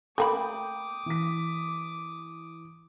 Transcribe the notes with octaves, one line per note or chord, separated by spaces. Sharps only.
A3 A#3 G5 B5 D6 D#6
E3 B6